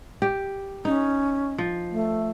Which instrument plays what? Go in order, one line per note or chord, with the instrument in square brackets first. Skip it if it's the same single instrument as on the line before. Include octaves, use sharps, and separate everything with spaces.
[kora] G4
[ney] C#4 [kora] D#4
[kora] F3
[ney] A3